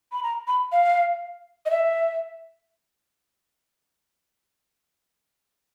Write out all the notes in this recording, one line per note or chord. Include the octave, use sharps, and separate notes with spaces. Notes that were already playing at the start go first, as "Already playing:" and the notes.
B5
A#5
B5
F5
D#5
E5